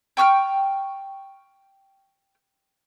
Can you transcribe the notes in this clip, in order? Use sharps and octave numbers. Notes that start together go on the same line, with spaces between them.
G5 C#6 E6 F6